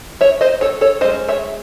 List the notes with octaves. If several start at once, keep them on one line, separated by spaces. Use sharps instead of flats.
C#5 E5
C5 D#5
A4 C#5
A4 C#5
G#3 C#4 C5 D#5
C#5 E5